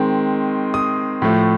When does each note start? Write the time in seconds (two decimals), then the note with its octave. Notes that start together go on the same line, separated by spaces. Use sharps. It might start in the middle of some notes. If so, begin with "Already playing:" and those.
Already playing: D#3 G#3 C4
0.74 D#6
1.22 A2 F3 A3